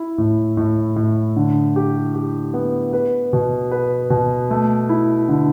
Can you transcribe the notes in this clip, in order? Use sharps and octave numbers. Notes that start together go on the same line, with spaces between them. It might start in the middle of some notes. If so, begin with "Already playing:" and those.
Already playing: E4
A2
A2
A2
D3
G4
G4
B3
B4
B2
B4
B2
A3
E4
D3